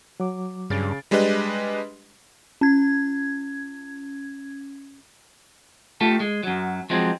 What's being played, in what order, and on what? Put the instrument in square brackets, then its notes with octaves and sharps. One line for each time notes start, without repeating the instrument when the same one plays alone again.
[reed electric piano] F#3 D6
[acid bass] G2 [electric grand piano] C#3 A6 D7
[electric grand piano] G3 G#3 D4 G4 B4 D#5
[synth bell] C#4 G#6
[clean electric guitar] A3 F4 G4 A4
G#3
F#2 F#3
F3 F#3 G#3 C4